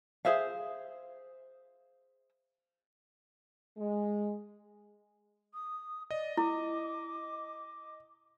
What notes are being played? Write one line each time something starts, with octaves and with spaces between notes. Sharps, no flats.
G#4 C5 E5 F5
G#3
D#6
D5 D#5
E4 D6